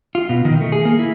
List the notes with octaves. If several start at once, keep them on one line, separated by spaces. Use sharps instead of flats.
F4
B2
D#3
A3
G#4
A#3
E4